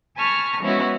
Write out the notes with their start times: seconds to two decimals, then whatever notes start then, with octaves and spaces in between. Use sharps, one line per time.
0.15 G#5 A5 B5 C#6 F6 A#6
0.60 F3 G#3 B3 C#4 E4 F#4